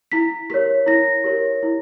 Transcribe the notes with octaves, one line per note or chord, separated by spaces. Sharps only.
E4 B6
G4 A#4 C#5 B6
E4 A#6
G4 A#4 C#5
E4